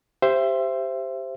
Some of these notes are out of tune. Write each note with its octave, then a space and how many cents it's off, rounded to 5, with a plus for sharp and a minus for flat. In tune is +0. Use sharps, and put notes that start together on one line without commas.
G4 +0 C5 +0 E5 +25